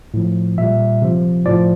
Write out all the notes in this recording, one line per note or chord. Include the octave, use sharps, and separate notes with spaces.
A2 F3
A#2 G3 E5
C3 F3
A2 F3 D5